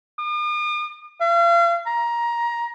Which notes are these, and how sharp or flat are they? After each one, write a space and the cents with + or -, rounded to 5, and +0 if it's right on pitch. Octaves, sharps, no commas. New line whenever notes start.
D#6 -45
F5 -40
A#5 +20